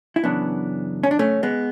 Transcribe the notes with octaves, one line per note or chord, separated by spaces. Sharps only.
E4
F#2 C#3 E3 B3 D4
C#4
D4
A3 C#4
G#3 B3